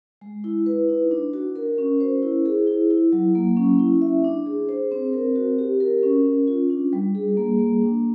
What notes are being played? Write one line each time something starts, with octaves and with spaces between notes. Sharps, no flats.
G#3
E4
B4
D#4
D4
F#4
A#4
C#4
C5
E4
G#4
E4
E4
F#3
A#3
C#4
E4
E5
D4
G#4
C5
C4
A#4
F#4
G4
A#4
C#4
C#4
F4
D4
G3
G#4
A#3
A#3
D4